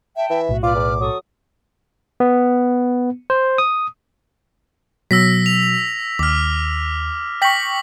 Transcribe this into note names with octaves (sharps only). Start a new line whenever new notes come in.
E5 G5 A5
E3 E5
B1 A2 F#4
F4 B4 D5 D6 F6
E2
F#3 A4 C#6 D#6
B3
C5
D#6
B2 F#3 E6 A#6 B6
F7
D#2 D6 F6
G5 C#6 A#6 B6 F#7